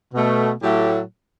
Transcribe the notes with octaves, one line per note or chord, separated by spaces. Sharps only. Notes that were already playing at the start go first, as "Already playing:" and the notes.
B2 A3
A2 F#3 A3 G4